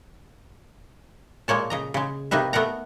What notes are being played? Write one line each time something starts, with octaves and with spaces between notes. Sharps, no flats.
A#2 G#3 A#3 C#5 A5
C#3 D#5 A#5
C#3 G#3
C3 A#3 D#4 B4 E5
A3 B3 A#4 F#5 A#5